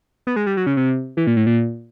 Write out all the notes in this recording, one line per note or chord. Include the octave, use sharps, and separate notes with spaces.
B3
G#3
G3
F#3
C#3
C3
E3
A#2
A2
A#2